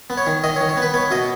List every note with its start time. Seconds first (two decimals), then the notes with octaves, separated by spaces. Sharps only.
0.10 B3
0.17 C#5
0.27 D#3
0.44 D#3 D#5
0.56 C#5
0.61 D#3
0.69 C#5
0.77 B3
0.82 B4
0.94 B3 C#5
1.11 B2 D#5